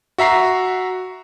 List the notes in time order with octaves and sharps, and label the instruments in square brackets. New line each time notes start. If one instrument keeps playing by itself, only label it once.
[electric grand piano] F#4 E5 A#5 C7